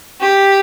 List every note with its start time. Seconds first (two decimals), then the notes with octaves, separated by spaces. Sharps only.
0.21 G4